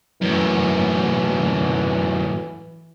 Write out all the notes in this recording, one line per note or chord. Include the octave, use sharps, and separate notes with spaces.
F#2 A2 E3